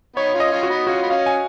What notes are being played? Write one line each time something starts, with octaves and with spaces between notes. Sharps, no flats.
B3 D#4 C#5
C#4 F4
D#5
C#4 F4
F#4
B3 D#4
C#4 F4 F#4
B3
C#4 F5
G#5